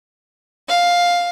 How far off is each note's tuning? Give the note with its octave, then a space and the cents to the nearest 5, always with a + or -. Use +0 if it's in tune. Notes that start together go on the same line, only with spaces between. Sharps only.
F5 +10